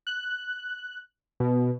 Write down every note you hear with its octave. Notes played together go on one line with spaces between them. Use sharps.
F#6
B2